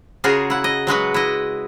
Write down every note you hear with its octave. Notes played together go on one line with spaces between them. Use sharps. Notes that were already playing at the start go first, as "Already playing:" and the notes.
C#3 F4 F#4 G#4 A#4
E4 F#5
D#5
F#3 G#3 F#4 B4
E4 D#5